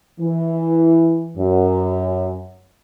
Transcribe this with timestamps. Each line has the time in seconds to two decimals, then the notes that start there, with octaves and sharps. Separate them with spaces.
0.20 E3
1.37 F#2